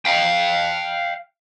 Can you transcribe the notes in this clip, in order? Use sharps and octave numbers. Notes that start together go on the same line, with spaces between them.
F5 G5